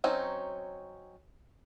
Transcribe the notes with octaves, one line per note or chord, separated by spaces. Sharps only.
F#3 C4 C#4 D#4